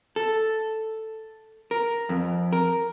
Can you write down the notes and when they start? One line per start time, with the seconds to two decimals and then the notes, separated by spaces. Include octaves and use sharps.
0.16 A4
1.71 A#4
2.09 F2
2.53 A#4